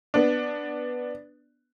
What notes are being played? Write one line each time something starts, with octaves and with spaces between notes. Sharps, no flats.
B3 D4